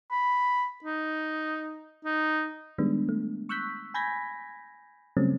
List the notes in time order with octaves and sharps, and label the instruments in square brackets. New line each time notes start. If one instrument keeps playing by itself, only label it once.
[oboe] B5
D#4
D#4
[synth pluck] D#3 G3 G#3 B3 D4
A3
C#6 E6 F#6 G6 B6
G#5 B5 G6 G#6 A#6 B6
C#3 F#3 G3 A3 C4 C#4